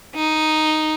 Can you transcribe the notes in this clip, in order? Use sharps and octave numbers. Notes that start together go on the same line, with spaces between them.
D#4